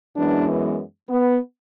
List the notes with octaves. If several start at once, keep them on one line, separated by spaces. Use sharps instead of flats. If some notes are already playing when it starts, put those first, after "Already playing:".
F#2 E3 G#3 B3 D4
B3